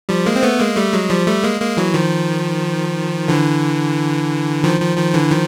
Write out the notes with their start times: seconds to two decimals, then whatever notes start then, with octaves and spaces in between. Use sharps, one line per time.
0.09 F3 G3
0.26 G#3 A#3
0.36 C4
0.43 A3 B3
0.59 G#3 A#3
0.77 G3 A3
0.93 F#3 G#3
1.10 F3 G3
1.27 G3 A3
1.44 G#3 A#3
1.61 G#3 A#3
1.77 E3 F#3
1.94 D#3 F3
3.28 D3 E3
4.64 D#3 F3
4.80 D#3 F3
4.97 D#3 F3
5.14 D3 E3
5.31 D#3 F3